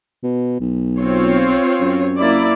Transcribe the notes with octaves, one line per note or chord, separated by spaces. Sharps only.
B2
B1
C4 F4 C#5
F#2
A#3 E4 D5